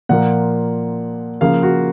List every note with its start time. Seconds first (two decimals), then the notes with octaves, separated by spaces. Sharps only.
0.09 A#2 F3 A#3 F#5
1.41 C#3 F3 A#3 F5
1.63 F#4